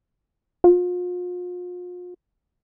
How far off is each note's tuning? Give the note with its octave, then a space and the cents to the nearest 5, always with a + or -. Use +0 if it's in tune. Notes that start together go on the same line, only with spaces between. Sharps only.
F4 +40